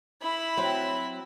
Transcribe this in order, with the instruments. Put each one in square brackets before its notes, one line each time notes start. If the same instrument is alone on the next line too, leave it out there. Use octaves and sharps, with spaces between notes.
[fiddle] E4 B5
[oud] F#3 C4